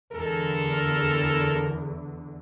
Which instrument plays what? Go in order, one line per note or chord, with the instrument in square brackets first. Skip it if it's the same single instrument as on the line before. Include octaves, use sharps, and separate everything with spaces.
[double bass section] E2 D3 [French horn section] G#3 A4 A#4